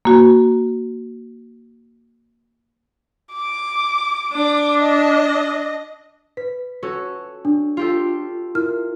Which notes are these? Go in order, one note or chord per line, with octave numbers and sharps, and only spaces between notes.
A#3 F#4
D6
D4 D6
D#5
B4 B6
C#4 F#4 A4
D4
F4 G4 A4
E4 A#4 F6